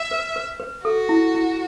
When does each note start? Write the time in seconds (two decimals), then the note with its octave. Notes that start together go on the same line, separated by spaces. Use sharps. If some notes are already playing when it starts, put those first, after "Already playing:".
Already playing: E5
0.11 B4
0.36 B4
0.60 B4
0.85 F#4 A4
1.09 E4
1.35 E4